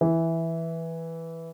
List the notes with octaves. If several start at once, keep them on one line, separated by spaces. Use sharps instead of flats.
E3